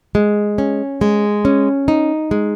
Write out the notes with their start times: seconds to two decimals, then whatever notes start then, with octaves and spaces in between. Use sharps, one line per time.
0.15 G#3
0.58 C#4
1.01 G#3
1.45 C#4
1.88 D#4
2.31 G#3